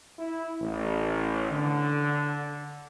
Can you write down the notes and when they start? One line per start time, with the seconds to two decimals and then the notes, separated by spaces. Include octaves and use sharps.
0.19 E4
0.61 A1
1.51 D3